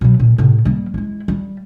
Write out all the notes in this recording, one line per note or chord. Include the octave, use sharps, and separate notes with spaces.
B2 F#3
A#2
A2 C3
G3 A#3
G#3 E4
G3